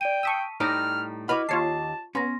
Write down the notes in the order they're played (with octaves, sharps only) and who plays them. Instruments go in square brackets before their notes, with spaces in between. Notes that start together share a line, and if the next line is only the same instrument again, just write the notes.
[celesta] D5 D7 D#7 [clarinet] G5
[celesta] A5 B6 D#7 [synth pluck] C#6 D#6 E6
[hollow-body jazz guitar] A2 G3 D#4 [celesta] A#5 [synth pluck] D6 A#6 [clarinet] F6
[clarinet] E4 [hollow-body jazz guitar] F#4 B4 B5 [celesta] D#5 D6 [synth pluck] F6
[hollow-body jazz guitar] D#2 [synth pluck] F4 C#5 C7 [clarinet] A5
[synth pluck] B3 [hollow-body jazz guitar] C#4 [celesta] C6 A#6